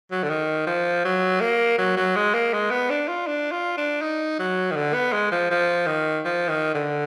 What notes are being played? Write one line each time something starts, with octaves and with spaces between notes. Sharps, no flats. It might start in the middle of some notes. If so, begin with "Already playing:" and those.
F#3
D3
D#3
F3
F#3
A#3
F#3
F#3
G#3
A#3
G#3
B3
D4
F4
D4
F4
D4
D#4
F#3
D#3
D3
B3
G#3
F3
F3
D#3
F3
D#3
D3